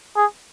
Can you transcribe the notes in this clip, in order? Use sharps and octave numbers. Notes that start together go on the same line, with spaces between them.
G#4